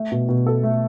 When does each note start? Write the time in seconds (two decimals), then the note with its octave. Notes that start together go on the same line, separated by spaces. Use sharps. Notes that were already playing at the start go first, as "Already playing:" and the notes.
Already playing: A3
0.12 B2
0.29 B2
0.46 A4
0.63 A3